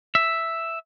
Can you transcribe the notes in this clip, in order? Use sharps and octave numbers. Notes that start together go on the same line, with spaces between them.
E5